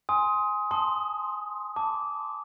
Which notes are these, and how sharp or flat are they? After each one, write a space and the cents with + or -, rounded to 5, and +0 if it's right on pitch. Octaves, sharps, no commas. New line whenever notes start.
G#5 +0 C6 +0 D#6 +20
A5 +0 C6 +5 D#6 -10
A5 +0 D6 -15